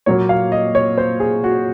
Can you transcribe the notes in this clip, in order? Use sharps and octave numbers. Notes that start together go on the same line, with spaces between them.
A#2 F#3 A#3 C#5
F5
D#5
C#5
C5
G#4
F#4